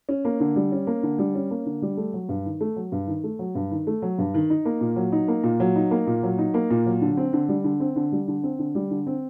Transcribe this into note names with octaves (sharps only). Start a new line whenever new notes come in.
C#4
A#3
D3
G3
C#4
A#3
D3
G3
C#4
A#3
D3
G3
A3
F#3
G2
D#3
A3
F#3
G2
D#3
A3
F#3
G2
D#3
A3
F#3
G2
D#3
D#4
A#3
A#2
F#3
D#4
A#3
A#2
F#3
D#4
A#3
A#2
F#3
D#4
A#3
A#2
F#3
D3
C4
D3
G3
D3
C4
D3
G3
D3
C4
D3
G3
D3
C4